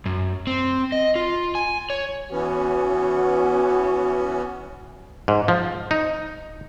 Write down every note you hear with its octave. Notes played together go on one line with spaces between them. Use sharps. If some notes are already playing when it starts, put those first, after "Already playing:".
F#2
C4
D#5
F4
G#5
C#5
E3 B3 C#4 F#4
G#2
F3
D#4